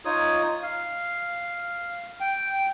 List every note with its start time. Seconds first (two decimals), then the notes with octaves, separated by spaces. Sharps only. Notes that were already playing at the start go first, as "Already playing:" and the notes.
0.05 D#4 F4 C#5 D#6
0.63 F5
2.20 G5